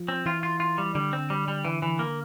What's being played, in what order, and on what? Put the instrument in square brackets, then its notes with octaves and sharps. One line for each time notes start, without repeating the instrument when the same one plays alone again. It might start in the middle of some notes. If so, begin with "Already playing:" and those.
Already playing: [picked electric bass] F3
[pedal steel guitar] C4
[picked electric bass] E3 [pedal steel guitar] F4
[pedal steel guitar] F4
F4
G3
[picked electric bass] D3 [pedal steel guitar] G3
[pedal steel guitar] C4
G3
G3
E3
E3
A#3